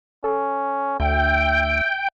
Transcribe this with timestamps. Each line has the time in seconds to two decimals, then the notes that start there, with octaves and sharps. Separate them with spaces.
0.24 C#4 A4
1.00 D2 E5 G5